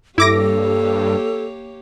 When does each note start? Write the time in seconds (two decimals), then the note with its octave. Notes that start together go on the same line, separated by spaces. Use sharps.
0.18 G2 A#3 E4 G4 A4 C#5 D6 A#6